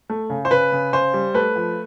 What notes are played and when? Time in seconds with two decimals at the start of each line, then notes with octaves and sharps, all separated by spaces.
0.10 A3
0.30 C#3
0.45 C5
0.51 C#3 B4
0.72 C#3
0.93 C#3 C5
1.14 G3
1.34 A3 B4
1.56 F3